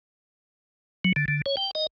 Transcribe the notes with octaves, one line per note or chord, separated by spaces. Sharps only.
F#3
D3
D3
C#5
G5
D#5